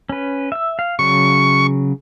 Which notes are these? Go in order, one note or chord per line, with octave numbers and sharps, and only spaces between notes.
C#4 B4
E5 E6
F5
C#3 F#3 C#6